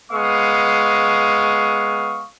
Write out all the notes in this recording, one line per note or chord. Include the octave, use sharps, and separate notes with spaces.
G#3 B3 F5 C#6 D#6